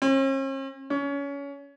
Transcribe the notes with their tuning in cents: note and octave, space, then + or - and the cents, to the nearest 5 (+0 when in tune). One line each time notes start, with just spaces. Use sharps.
C#4 -45
C#4 +25